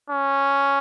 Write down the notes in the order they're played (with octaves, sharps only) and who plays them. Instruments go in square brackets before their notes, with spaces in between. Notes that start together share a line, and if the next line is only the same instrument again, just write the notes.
[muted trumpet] C#4